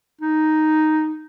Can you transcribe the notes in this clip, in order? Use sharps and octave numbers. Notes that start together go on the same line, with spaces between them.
D#4